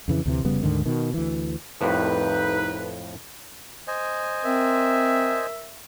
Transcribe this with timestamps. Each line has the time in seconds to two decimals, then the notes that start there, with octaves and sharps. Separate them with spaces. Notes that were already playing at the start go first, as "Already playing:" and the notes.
0.08 F2 C#3 E3
0.26 D2 C3 E3
0.45 F1 C#3 G3 B3
0.63 D2 G#2 D3 D#3
0.86 B2 D#3
1.14 D2 E3
1.81 C2 F2 A2 D#4 B4
3.87 C5 D#5 G#5
4.45 C4 A#4 E5